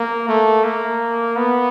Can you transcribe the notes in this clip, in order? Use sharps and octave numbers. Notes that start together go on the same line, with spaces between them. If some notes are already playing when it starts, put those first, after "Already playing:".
Already playing: A#3
A3
A#3
B3